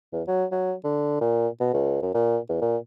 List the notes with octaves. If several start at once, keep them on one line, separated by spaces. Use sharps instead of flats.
E2
F#3
F#3
D3
A#2
B2
C#2
F#2
A#2
E2
A#2